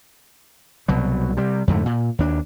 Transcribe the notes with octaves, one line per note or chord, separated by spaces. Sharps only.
C2 B2 F#3
C3 G3
F2 G#2 D3 A3
A#2
D#2 D4